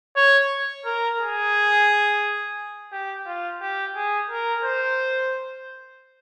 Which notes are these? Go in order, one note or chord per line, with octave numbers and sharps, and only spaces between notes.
C#5
A#4
G#4
G4
F4
G4
G#4
A#4
C5